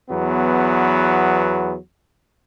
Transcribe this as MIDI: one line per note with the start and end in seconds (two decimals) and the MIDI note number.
0.10 1.76 40
0.10 1.76 54
0.10 1.76 59